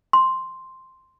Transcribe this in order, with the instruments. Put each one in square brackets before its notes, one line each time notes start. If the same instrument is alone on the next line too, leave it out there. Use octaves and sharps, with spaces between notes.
[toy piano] C6